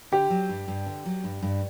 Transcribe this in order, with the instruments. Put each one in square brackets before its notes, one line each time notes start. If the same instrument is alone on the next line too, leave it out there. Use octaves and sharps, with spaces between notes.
[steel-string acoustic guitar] D3 [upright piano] G4
[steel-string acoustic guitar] F#3
G2
G2
D3
F#3
G2
G2